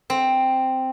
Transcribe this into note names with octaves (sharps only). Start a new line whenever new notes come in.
C4